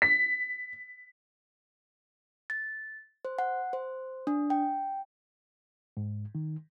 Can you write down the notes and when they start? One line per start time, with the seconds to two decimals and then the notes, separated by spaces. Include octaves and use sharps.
0.02 B6
2.50 A6
3.25 C5
3.39 F#5
3.73 C5
4.27 D4
4.50 G5
5.97 G#2
6.35 D#3